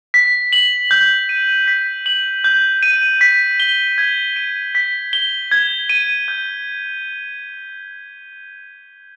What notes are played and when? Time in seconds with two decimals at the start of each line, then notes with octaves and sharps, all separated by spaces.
0.14 B6
0.53 F#7
0.91 G6
1.29 D#7
1.68 B6
2.06 F#7
2.44 G6
2.83 D#7
3.21 B6
3.60 G7
3.98 G#6
4.36 D#7
4.75 B6
5.13 G7
5.52 G#6
5.90 D#7
6.28 G6